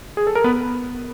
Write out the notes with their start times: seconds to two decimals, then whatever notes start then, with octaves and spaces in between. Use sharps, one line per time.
0.17 G#4
0.27 A4
0.35 A#4
0.44 B3 B4